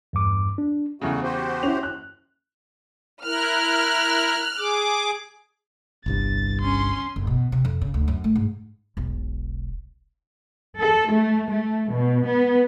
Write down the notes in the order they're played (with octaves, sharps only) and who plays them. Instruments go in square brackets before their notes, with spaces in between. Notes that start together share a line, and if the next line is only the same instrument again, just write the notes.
[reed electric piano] E2 G2 D6
D4
[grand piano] E2 C#3 [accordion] G3 A3 F#4
[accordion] F#4 G4 C5
[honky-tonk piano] C#4 E4 [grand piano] F7
[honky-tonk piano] F#6
[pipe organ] E4 A#4 [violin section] F6 F#6
[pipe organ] G#4 D6
[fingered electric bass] G1 C2 G2 [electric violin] A6
[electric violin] C#4 C6
[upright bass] F#1
B2
C3
F2
C#3
D2
F#2
A3
G#2
E1 B1
[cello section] A4
A3
A3
B2
B3